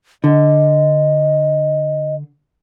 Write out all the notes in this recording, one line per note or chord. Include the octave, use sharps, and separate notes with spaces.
D3 D#5